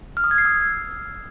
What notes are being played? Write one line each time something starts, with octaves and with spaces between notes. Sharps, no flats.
F6
D#6
G#6
C7
E6